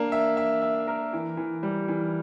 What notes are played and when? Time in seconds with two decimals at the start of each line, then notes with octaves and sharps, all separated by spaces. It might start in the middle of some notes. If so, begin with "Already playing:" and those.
Already playing: A#3 D4
0.12 E5
0.37 E5
0.62 E5
0.87 A#4
1.13 E3
1.37 E3
1.63 G3
1.88 E3